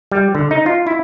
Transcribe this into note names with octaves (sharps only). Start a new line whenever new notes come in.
G3
D3
D#4
F4
E4